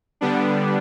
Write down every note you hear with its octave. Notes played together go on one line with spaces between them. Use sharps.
D3 G3 B3 D4